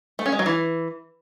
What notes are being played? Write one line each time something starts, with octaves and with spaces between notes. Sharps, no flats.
A3
C#4
G#3
F#3
E3